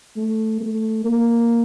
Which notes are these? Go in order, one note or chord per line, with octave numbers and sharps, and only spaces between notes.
A3
A3
A#3